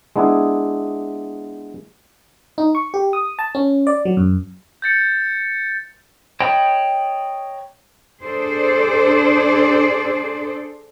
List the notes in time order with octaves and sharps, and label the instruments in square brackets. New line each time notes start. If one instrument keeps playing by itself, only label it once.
[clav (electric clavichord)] G#3 B3 D4 E4 G#4
[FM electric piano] D#4
C#6
G4
D#6
A5
C#4
D5
F#3
F#2
[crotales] G6 A6 C#7
[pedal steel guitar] C#5 D#5 G5 A5 B5
[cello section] D4 G#4 A4 C5 D5